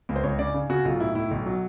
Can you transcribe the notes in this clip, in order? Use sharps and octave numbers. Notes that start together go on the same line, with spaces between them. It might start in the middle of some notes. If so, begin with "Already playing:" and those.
C#2
C5
C#2 C#5
C#3 D5
C#3
C#3 F#4
B1 F4
A2 E4
A2 E4
B1
F#3